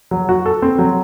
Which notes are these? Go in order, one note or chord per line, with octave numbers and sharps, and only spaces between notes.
F#3
F#4
A4
C4
F#3